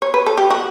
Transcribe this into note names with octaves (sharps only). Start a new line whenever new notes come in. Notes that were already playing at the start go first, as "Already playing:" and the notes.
C#5
B4
A4
G4
F#4